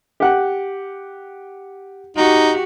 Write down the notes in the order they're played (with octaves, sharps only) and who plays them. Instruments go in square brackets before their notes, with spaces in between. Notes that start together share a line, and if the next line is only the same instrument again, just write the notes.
[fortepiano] G4 F#5
[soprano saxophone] D#4 [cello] F#4 G4